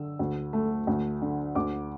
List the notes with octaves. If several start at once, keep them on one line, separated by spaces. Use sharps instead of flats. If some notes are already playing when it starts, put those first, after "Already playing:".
Already playing: D3 E6
D2
A3
D2
D3
D2 D6